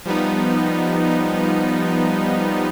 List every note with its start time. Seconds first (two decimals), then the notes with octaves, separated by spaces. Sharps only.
0.06 F3 G3 B3 D#4